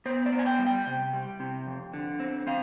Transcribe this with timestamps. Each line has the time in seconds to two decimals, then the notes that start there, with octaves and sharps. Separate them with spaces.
0.06 B3 C5
0.26 D5
0.32 B3
0.39 G#5
0.46 G5
0.59 G3
0.66 G5
0.87 C3
1.13 G3
1.40 C3
1.66 F2
1.94 D3
2.20 C4
2.47 C4 F5